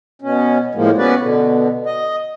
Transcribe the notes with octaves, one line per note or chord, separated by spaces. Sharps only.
B2 C#4
A2 F3 G#3 A#3
B3 C#4 F#4 B4 D5
B2 D3
D#5